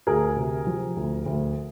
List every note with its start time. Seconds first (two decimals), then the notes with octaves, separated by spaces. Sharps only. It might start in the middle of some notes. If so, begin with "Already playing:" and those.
0.07 D2 G#4 A#4
0.36 C3
0.67 F3
0.96 D2
1.26 D2